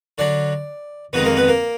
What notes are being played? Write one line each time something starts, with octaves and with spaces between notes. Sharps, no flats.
D3 F#3 D4 D5
F2 D#3 G#3 B3 D#4 B4
A#3 A#4
B3 B4
A#3 A#4